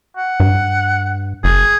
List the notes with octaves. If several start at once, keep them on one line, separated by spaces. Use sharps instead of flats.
F#5
G2
F#1 G#4